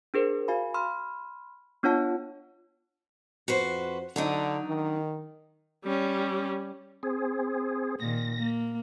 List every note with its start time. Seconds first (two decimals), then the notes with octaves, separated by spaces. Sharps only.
0.14 D4 G#4 A#4 C5
0.48 F#4 F5 G#5 B5
0.74 B5 C6 F6
1.83 B3 D4 F4 C#5 F#5 A5
3.48 F2 F#4 B4 C5
4.16 D3 F#3 D4 D#4
4.68 D#3
5.84 G3 C#4
7.03 C4 G#4
8.00 A#2 D#3 A#6
8.37 A#3